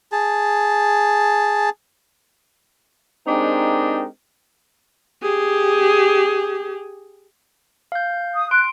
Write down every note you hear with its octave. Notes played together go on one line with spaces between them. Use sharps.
G#4 A5
G#3 C4 D4 D#4 G4 A#4
G4 G#4
F5 G6
D#6
C6 F#6 D7